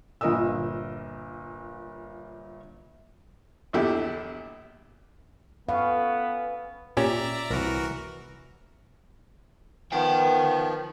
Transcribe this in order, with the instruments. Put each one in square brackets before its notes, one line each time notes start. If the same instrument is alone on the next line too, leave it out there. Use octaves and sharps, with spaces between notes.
[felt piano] G1 A#2 A#4 D#5 D#6 E6
[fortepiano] A#1 E2 D3 E4 G4
[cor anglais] B3 [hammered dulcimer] C#4 A4 B4 [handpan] F5
[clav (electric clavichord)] A#2 C#4 G4 [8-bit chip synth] D5 E5 A#5
[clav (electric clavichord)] C2 [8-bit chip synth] E3 F#4 A#4
[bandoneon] D#3 F3 [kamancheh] B3 [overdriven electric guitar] A#4 G5